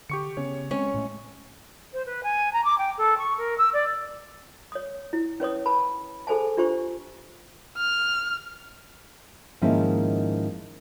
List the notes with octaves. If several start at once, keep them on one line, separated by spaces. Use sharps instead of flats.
D3 G4 C#6 C#7
C#3 B3 C#4 C#5
G#3 C4 C#4
A2 G#3 A3
C5
B4
G#5
A#5
D6
G5
A4
C#6
A#4
E6
D5
C#5 D#6
E4
C#4 B4 C#5 D#6
B4 A5 B5
G#4 A4 C5 G#5 A5
D4 F4 G4 C5 C#6
F6
G#2 D#3 F3 A#3 C#4 E4